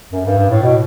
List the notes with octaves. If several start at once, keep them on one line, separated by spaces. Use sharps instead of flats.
F#2
G2
G2
A2
B2